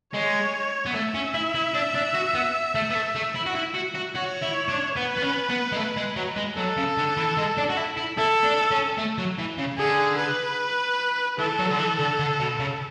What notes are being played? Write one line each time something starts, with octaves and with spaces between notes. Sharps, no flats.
G#3 C#5
B3
A3 E5
C#4
E4
E4
D4
D4
F#4
B3
A3
B3
A3
A3
E4
F#4
E4
F#4
F#4
F#4 C#5
E4
D4
B3 B4
B3
C#4
B3
G#3
A3
G#3
F#3
G#3
F#3 A4
C#3
D3
E3
G#3
D4
F#4
E4
E4
E4 A4
D4
C#4
A3
F#3
E3
C#3
D3 G#4
B4
E3 A4
F#3
D3
E3
D3
D3
B2
C#3